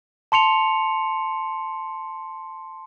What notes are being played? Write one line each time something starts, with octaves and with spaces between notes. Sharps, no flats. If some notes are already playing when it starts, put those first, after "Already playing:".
A5 C6 C#7 F7